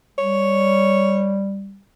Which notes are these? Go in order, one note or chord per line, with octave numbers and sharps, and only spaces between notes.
G3 C#5